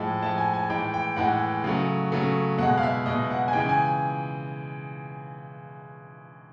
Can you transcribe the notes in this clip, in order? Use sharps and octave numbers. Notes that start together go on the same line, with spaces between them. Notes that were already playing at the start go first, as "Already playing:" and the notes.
Already playing: A2 F3 G#3
A2 F3 G#3 A5
G#5
G#5
A2 E3 G#3 G5
G5
A2 E3 G#3 F#5
C#3 F#3 A3
C#3 F#3 A3
B2 G#3 F#5
F5
E5
B2 G#3 D#5
F#5
G#5
C#3 E3 G#3 G5
G#5